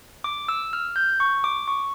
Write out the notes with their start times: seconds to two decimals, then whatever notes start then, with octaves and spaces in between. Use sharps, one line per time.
0.24 D6
0.48 E6
0.73 F6
0.96 G6
1.20 C#6
1.44 D6
1.68 C#6